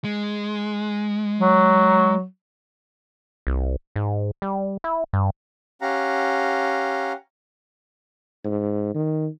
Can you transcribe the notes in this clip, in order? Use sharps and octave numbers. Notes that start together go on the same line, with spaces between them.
G#3
F#3
C2
G#2
G3
E4
G2
C#4 G4 F5 F#5 A#5
G#2
D#3